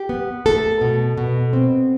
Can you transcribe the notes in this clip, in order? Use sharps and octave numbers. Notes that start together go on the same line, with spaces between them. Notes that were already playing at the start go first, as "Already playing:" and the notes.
Already playing: G4
B3
A3 A4
B2
B2
C4